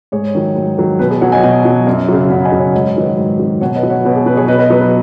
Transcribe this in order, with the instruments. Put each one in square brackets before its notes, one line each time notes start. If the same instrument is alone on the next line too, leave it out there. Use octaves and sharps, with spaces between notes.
[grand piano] G#2 G#4 C#5
D#3 F#3
G#2
D#3 F#3
B2 B4
G#4
F#3 C#5 F#5
D#5 G#5
B2 D#5 G#5
F#3
F#2
C#3 F#3
F#2 F#5 B5
D#5 G#5
C#3 F#3
C#5 F#5
G#2 D#5
C#5
D#3 F#3 B4 D#5
G#2
D#3 F#3
B2 C#5 F#5
B4 D#5
F#3
C#5 F#5
B2 B4
G#4
F#3 B4
G#4 C#5
B2 B4 D#5
B4 D#5
F#3 B4
B4